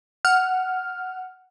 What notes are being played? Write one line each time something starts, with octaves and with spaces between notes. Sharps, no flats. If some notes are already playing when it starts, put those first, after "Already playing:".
F#5 F6